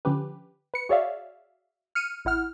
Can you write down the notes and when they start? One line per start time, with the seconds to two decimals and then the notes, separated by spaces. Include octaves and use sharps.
0.05 D3 F3 C#4 G4 B4
0.74 B4 C#7
0.89 F#4 G#4 C#5 D5 E5 F5
1.95 F6 C#7 D#7
2.25 A1 E4 F#5 F6